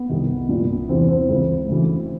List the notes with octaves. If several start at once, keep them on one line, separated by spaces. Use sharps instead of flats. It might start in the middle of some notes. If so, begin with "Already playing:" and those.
Already playing: B3
C2 C3 D#3
C2 A#2
E2 C3 E3 C4
C4
C#2 C#3 E3
D2 C#3 E3